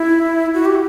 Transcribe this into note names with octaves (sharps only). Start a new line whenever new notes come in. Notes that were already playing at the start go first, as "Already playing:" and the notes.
Already playing: E4
F#4
G4